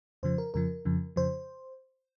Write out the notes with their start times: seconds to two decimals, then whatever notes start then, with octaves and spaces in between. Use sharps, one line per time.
0.23 F2 C#3 F3 C5
0.38 A#4
0.54 F2 C#3 F3 A#4
0.85 F2 C#3 F3
1.16 F2 C#3 F3 C5